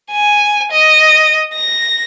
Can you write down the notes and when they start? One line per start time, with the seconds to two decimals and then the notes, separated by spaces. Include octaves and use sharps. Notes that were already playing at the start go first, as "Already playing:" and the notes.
0.12 G#5
0.71 D#5
1.54 A#6